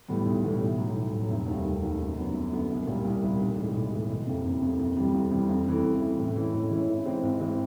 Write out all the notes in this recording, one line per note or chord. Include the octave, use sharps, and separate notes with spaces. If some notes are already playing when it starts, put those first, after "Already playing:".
A2 E3 G3 B3
B1
A2 E3 G3 B3
B1
A2 F#3
B1
A2 F#3
F1
D#2 D#3 G3
F1
D#2 D#3 G3
F#2
D3 F#3 B3
F#2
D3 F#3 B3
C2
A#2 G3
C2
A#2 G3
B1
A2 E3 G#3
B1
A2 E3 G#3
F#1
F2 C3
F#1
F2 C3
F2
C3 E3 G3
F2
C3 E3 G3
F2
C#3 E3 A3
F2
C#3 E3 A3
A2
E3 G#3 C#4 E4
A2
E3 G#3 C#4 E4
G#1
G#2 E3 G#3 C4
G#1
E3 G#3 C4